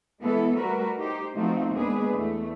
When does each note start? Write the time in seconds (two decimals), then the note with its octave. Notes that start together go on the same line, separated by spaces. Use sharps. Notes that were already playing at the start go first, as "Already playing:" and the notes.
0.22 E3 G#3 B3 E4 A4
0.58 G3 A3 F#4 A#4 B4
0.99 D#4 G4 C5
1.37 F3 A3 B3 C4 D#4 F#4
1.75 D#2 G#3 B3 D4 G#4 B4
2.13 E2 A3